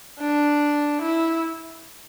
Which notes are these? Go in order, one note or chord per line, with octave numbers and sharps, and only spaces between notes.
D4
E4